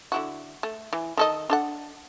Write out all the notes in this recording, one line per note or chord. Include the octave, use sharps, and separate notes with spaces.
D3 E4 F#4
A3
E3
D#3 A4 D#5
D4 A4 F#5